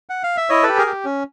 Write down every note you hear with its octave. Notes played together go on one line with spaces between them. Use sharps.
F#5
F5
E5
E4 C#5 D#5
G4 A4 B4
G#4 A#4
G4
C#4